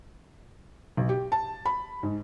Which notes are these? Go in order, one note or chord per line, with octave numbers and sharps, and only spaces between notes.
B1
G4
A5
B5
G#2